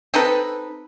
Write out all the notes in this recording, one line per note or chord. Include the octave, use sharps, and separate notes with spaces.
C4 D#4 A4 B4